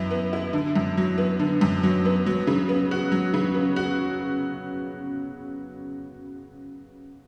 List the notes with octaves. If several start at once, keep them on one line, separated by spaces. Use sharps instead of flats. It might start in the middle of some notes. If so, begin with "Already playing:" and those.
Already playing: F#2 E3 B3 E4
B3
E4
D3
F#2
F#3
B3
D3
F#2
F#3
B3
F#3
C#3
B3
F#4
F#3
C#3
B3
F#4